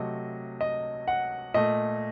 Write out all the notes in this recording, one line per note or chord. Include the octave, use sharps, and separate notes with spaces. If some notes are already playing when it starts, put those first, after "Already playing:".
Already playing: C3 F#3 A3 D#5
D#5
F#5
A#2 A3 D#5